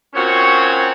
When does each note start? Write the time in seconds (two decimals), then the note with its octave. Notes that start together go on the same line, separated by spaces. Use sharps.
0.15 A#2 C4 C#4 F#4 C#5